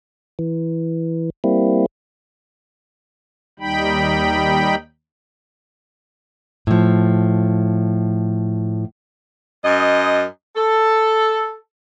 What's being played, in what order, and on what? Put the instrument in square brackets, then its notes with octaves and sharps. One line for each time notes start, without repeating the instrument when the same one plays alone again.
[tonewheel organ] E3
G3 A#3 C4 E4
[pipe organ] D#2 G3 D#4 G5 B5
[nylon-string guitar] A2 F3
[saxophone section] F#2 D#5
A4